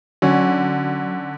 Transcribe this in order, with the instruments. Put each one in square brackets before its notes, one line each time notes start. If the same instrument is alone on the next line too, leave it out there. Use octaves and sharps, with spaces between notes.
[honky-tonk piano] D3 [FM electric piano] F#3 [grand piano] C#4